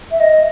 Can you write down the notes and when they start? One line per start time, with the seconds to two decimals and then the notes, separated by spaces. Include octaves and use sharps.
0.11 E5
0.20 D#5